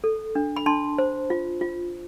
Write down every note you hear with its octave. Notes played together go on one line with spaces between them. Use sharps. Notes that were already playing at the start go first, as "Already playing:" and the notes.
A4
D4
B5
D4 A5 C6
C5
F4
F4